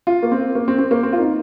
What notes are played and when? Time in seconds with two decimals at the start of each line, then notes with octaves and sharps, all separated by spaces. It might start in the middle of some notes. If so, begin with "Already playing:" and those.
0.07 F4
0.23 A#3
0.32 C4
0.55 A#3
0.68 C4
0.79 C4
0.91 A#3
1.03 C4
1.13 F4
1.19 D#4